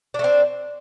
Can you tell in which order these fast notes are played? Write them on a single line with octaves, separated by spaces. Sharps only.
D4 A3 C4